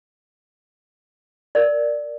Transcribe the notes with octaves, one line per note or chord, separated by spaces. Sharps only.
A#4 D5